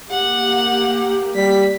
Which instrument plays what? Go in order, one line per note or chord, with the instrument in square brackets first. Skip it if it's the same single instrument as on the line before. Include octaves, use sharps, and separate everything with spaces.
[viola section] A#3 G4 [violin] F#5
[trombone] G3 [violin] B6